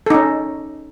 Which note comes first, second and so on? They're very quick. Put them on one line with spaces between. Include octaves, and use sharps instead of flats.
A4 D#4 C#4